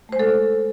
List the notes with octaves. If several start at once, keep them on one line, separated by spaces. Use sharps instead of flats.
G#3 A3 A4 C5